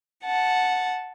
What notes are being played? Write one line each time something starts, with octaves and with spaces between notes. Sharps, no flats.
F#5 A5